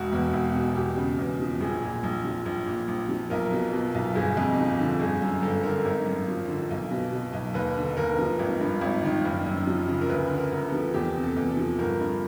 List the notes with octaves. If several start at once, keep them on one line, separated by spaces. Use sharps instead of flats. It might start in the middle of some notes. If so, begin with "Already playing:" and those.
Already playing: E1 F#4
E2
E1
B2
E2 G4
C#3
E2
F3
A#1 G#4
A#2
A#1
F3
A#1
A#2
A#1
F3
B1 A#4
B2
B2
B1
G1 G#4
F2
F3
D3
G1 G#4
F#2
G1 A4
D3 A#4
G#1 A#4
F#2
F3
D3
B1
B2
B2
B1
D#2 B4
D3
D#2 A#4
F3
G#1
G2
G#1
D#3
F#1
F#2
F3
C#3
A#4
D2 B4
D3
A#4
D2
A4
F3
E2 G4
C3
A4
E2
A4
F3
G1 A#4
G2